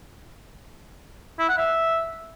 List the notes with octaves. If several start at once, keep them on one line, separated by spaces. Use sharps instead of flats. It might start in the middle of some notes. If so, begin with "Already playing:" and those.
E4
F#5
E5